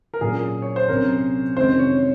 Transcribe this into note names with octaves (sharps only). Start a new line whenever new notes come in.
A#4
A#2 F#3 C#4 G#4
C#5
C5
C2 C3 F#3 C#4 A#4
F2 C3 D#3 G#3 C#4 C5
C#5